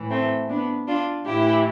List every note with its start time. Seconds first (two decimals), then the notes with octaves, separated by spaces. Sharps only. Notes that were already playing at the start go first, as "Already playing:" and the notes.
Already playing: A2 E3
0.10 A3 C4
0.48 B3 D4
0.87 D4 F4
1.26 A2 E3 E4 G4